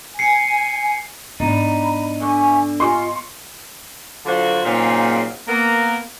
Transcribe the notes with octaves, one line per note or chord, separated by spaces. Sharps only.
G#5 C7 C#7
G#2 B3 D4 D#4 A#5 B5
D3 E5 G#5 C#6
F4 D#5 G#5 C6 C#6
D3 F#3 F4 F#4 C5 F5
A#2 C#3 F#3 C4 D#4 G#4
A#3 B3 A#4